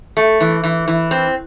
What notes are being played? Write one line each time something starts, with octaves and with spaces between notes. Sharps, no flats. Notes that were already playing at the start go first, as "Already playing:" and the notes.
A3
E3
E3
E3
C4